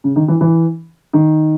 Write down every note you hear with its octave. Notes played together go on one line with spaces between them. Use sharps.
C#3
D#3
E3
E3
D#3